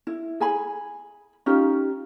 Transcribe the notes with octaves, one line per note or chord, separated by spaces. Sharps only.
E4
G#4 G#5 B5
C#4 D#4 F4 G4